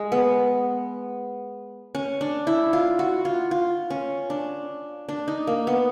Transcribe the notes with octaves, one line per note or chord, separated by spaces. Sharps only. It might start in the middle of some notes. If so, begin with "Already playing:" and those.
Already playing: G#3
B3
C#4
D4
E4
F4
F#4
F4
F4
C#4
D4
D4
D#4
A#3
B3